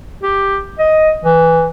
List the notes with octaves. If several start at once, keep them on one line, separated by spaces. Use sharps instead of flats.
G4
D#5
E3